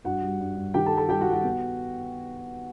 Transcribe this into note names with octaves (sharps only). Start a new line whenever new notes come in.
G2 F#4 F#5
G3
G2
G2
D#3 G4 G5
A4 A5
G3
A4 A5
G3 G4 G5
F#4 F#5
G3
F#4 F#5
B3